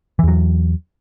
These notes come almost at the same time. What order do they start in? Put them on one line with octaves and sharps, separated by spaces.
E3 E2 F#3